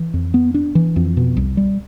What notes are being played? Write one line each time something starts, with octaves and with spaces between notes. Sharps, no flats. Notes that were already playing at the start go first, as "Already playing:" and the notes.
Already playing: E3
F2
B3
D4
E3
F2
B2
C2
G3